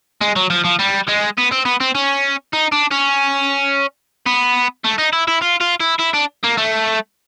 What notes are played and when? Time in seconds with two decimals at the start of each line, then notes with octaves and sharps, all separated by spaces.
0.21 G#3
0.36 F#3
0.50 F3
0.65 F3
0.79 G3
1.08 G#3
1.38 B3
1.52 C4
1.65 B3
1.80 C4
1.95 C#4
2.53 D#4
2.72 D4
2.91 C#4
4.26 B3
4.84 A3
4.98 D#4
5.13 E4
5.27 E4
5.42 F4
5.60 F4
5.80 E4
5.99 E4
6.14 D4
6.43 A#3
6.57 A3